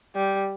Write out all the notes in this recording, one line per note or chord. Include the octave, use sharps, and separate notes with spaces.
G3